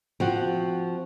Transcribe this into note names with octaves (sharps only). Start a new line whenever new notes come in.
F3 C4 F#4